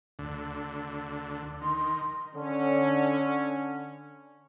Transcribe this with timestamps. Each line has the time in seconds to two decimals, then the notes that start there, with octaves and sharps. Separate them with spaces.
0.19 D2 D3
1.62 D#3 C6
2.35 D3 C#4